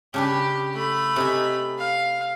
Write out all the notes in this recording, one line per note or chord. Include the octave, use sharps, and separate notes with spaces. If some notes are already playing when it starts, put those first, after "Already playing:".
C#3 D4 G4 B4
A3 B5
C3 D#4 G#5
F5